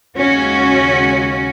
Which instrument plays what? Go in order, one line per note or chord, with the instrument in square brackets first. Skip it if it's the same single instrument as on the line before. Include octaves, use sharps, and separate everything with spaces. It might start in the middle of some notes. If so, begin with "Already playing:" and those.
[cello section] D#2 C#3 G#3 C#4 F#4